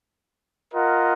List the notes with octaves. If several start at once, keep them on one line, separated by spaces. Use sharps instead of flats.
F4 A#4 D#5 F#5